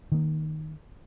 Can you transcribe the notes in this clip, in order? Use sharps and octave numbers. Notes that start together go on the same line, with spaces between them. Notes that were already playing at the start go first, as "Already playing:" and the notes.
D#3 A#3